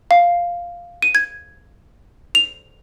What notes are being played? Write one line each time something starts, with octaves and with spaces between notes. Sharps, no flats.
F5
D#7
G#6
F7